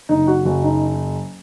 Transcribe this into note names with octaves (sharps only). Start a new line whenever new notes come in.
F#1 D#4
F#4
F#1 F#4
D#4